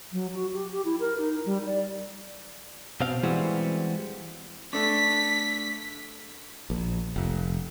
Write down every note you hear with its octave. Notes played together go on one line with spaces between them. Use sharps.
F#3
F#4
G4
G4
E4
A#4
D#4
G3
D5
B2 C4 F5
E3 G3 G#3 B3 C4 F#4
A3 D4 B6
A#1
F1